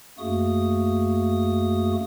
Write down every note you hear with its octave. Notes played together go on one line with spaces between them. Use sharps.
F#2 A3 A#3 F#4 G#4 D#6